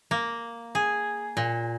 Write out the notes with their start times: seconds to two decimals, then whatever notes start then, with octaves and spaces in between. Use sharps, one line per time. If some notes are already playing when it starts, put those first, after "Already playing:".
0.11 A#3
0.75 G#4
1.37 A#2